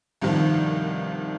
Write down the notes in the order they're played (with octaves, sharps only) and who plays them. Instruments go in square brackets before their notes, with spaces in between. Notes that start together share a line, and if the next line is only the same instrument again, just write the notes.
[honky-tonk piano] C2 G2 C3 D#3 F3